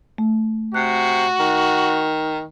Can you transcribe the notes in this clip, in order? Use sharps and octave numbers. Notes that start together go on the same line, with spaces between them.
A3
C3 F#4 F#6
D#3